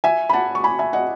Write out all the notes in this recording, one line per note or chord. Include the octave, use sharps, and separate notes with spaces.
E5 G#5
B5
F#5 A5
C#6
G#5 B5
E5 G#5
D#5 F#5